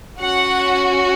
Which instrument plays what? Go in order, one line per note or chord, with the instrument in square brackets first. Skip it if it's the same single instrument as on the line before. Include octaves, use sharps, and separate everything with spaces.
[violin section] C#4 F#4 F#5